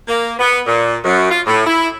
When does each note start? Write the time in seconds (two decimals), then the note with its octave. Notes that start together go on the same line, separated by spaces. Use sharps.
0.08 A#3
0.39 B3
0.67 A#2
1.04 F#2
1.31 F4
1.47 A2
1.66 E4